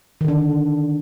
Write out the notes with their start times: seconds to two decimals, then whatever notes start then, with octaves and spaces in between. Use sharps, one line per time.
0.21 D#3
0.25 D3
0.28 D4